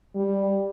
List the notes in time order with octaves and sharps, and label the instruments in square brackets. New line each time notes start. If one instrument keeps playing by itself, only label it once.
[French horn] G3